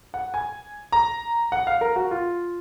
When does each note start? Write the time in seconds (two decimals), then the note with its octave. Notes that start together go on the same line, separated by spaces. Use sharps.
0.14 F#5
0.34 G#5
0.92 A#5
1.52 F#5
1.67 F5
1.81 A#4
1.96 F#4
2.11 F4